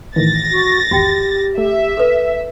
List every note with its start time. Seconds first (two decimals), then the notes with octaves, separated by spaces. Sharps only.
0.16 A2 D#3 E3 A6 A#6
0.51 F#4
0.91 G#1 E2 F#4 G4 G5
1.58 A3 E5
1.97 A4 B4